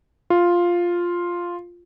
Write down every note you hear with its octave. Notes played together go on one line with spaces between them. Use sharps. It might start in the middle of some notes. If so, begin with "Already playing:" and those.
F4